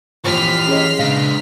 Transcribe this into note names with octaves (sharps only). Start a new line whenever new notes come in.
A#1 F2 E3 G4 C6 F6 B6
C#4 G#4 C#5 D#5
A#2 C#3 G#3 D4 F5 A#6